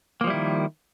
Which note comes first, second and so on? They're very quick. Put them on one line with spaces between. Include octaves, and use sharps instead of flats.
A#3 F3 G3 E4 D#3